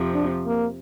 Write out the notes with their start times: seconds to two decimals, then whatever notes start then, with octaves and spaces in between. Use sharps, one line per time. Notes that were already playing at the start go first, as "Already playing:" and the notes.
Already playing: F2 C3 F3
0.14 D4
0.46 A#3